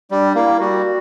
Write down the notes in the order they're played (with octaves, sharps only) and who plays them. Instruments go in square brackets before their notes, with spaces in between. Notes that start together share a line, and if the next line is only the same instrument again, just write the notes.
[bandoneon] G3 [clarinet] D4
[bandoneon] A#3 [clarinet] E4
[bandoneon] G3 [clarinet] F#4